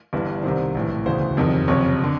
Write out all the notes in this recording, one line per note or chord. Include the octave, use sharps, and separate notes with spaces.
G1 G2 E3
C2 C3 D#3 C5
A#1 A2 E3
E1 D2 C#3 E3 C5
F#1 F2 C3 D#3
F#1 F2 C3 C#5
D3